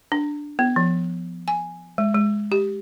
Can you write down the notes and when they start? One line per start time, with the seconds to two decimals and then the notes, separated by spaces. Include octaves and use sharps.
0.12 D4
0.59 B3
0.76 F3
1.48 G#5
1.98 G#3
2.15 G#3
2.52 G4